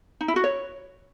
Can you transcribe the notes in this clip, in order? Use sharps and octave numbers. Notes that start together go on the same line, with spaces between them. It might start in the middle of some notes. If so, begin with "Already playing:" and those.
D#4
E4
F#4
C#5